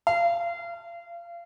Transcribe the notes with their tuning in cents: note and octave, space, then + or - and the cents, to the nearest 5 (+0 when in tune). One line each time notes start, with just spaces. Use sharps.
F5 -30